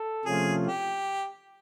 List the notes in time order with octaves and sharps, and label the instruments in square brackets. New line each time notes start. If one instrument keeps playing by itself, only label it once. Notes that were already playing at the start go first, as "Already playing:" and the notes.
Already playing: [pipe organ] A4
[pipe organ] C3 F3 A3 C#4 F4 [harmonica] G#4
[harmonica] G4